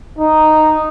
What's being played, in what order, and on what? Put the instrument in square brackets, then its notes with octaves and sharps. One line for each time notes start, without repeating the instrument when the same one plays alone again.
[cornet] D#4